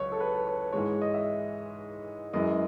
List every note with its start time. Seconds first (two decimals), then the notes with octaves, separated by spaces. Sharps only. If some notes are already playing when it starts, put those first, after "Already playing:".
Already playing: C#2 F#3 C#5
0.12 A4
0.20 B4
0.47 C#5
0.72 G#2 E3 G#3 C#5
1.01 D#5
1.14 E5
2.33 F#2 E3 G#3 D#5